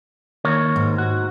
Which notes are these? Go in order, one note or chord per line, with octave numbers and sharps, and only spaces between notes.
D#2 A#4 C#5
G#2
F#4